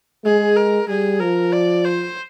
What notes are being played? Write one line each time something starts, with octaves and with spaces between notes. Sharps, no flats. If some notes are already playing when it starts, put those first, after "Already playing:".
G#3 G#4
A#4
G3 G#4
F3 A#4
D5
C5